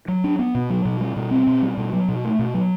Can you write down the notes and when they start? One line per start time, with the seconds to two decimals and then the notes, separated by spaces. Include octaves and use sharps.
0.08 F#3
0.24 D4
0.39 B3
0.55 B2
0.70 F#3
0.85 B2
1.01 G3
1.16 B2
1.31 C4
1.47 B2
1.62 G3
1.77 B2
1.93 F#3
2.08 B2
2.24 A3
2.39 B2
2.54 F#3